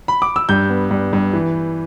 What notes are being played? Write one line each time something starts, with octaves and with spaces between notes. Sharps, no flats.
B5
D6
E6
G2 G6
B3
G2
G2
E3